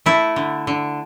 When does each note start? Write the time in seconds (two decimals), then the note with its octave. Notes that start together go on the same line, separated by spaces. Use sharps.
0.06 A3 E4
0.36 D3
0.67 D3